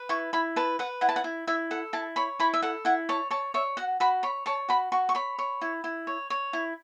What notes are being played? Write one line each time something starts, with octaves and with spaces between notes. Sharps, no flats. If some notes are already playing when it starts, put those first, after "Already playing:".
Already playing: B4
E4 C#6
E4 B5
B4 A5
B4 F#5
E4 F#5
A5
F#5
E4
E4 E5
A4 F#5
E4 A5
C#5 B5
E4 B5
E5
A4 F#5
E4 F#5
C#5 A5
C#5 A5
C#5 E5
F#4 F#5
F#4 B5
C#5 B5
C#5 A5
F#4 B5
F#4 C#6
C#6
C#5 B5
C#5
E4
E4
C#5
C#5
E4